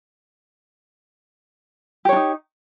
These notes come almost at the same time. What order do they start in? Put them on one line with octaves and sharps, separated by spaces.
G4 C#5 D4 D#4